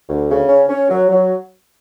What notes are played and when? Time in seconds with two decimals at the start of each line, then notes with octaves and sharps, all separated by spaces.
0.09 D2
0.30 C#3
0.49 C#4
0.69 C#4
0.90 F#3
1.09 F#3